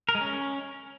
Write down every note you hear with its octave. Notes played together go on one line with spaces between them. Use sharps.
A#4
G#3
C#4